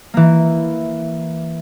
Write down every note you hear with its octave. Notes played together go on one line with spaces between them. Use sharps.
E3 A#3